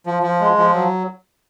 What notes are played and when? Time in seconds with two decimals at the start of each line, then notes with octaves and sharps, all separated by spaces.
0.06 F3
0.23 F3
0.41 G#3
0.58 F3
0.74 F#3